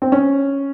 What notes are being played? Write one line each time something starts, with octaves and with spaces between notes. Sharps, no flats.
C4
C#4